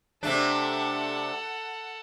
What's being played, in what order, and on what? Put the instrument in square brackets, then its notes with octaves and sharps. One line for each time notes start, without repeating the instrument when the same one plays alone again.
[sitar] C3 A3 D4 [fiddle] A4 F#5